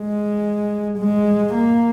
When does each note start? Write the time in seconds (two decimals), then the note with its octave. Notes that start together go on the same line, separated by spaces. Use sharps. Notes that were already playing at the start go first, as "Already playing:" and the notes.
Already playing: G#3
0.99 G#3
1.54 A#3